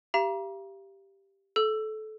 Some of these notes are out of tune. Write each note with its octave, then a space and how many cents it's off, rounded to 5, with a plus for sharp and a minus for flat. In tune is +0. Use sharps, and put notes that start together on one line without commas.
G4 +0 F5 -40 A#5 +35
A4 -25 E6 +15